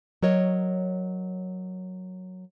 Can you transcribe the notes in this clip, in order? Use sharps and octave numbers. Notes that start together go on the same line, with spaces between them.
F#3 A#4 C#5 D#5